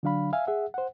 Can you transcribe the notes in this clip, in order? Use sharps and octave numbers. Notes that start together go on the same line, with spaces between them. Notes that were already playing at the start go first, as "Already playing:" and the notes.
D3 F#3 D4 F5 B5
E5 F5 G#5
G#4 E5 F#5
C5 F#5